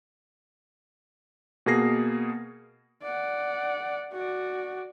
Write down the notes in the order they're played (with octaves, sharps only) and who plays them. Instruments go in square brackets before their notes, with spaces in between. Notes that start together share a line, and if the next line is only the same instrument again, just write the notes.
[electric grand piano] B2 A#3 G#4 A#6 C7
[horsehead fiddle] D5 F#5
F#4 D5